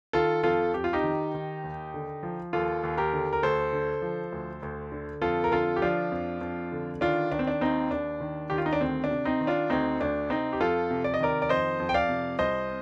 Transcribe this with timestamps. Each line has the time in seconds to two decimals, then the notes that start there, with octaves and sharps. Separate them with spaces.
0.13 D#3 F4 A4
0.43 F2 F4 A4
0.74 F2 G4
0.84 F4
0.93 D#4 G4
1.03 D#3
1.34 D#3
1.64 D#2
1.94 D3
2.23 F3
2.53 D#2 F4 A4
2.83 D#2
2.98 G4 A#4
3.13 D3
3.33 A#4
3.43 D2 A4 C5
3.73 D3
4.02 F3
4.32 D2
4.63 D2
4.92 D3
5.21 F2 F4 A4
5.44 A#4
5.52 D3 F4 A4
5.76 G4
5.82 F3 D4 F4
6.12 F2
6.41 F2
6.72 D3
7.01 D#3 D4 F4
7.32 D#3 D4
7.39 C4
7.47 D4
7.61 D#2 C4 D#4
7.91 D#2 D4
8.20 D#3
8.50 D#3 G4
8.58 F4
8.66 D#4
8.73 D4
8.81 D2 C4
9.04 D4
9.11 C3
9.25 C4 D#4
9.41 D#3
9.47 D4 F4
9.70 D2 C4 D#4
10.00 D2 D4
10.30 C3 C4 D#4
10.53 G4
10.60 F2 F4 A4
10.90 C3
11.04 D5
11.14 D#5
11.20 D#3 A#4 D5
11.42 D5
11.49 F2 C5 D#5
11.80 F2
11.89 G5
11.94 D5 F5
12.09 C3
12.39 C2 C5 D#5